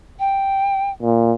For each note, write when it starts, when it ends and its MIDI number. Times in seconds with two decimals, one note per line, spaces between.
0.19 0.90 79
1.03 1.33 46